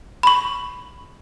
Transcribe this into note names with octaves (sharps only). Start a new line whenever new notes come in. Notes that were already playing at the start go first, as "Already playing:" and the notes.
B5 C#6